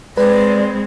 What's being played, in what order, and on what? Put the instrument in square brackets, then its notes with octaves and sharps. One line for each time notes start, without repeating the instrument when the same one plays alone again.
[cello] G#3 C4 [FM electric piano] B4 [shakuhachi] D5